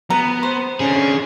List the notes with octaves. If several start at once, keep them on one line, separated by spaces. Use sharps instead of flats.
B3 A#5
C5
D3 C#4 G#4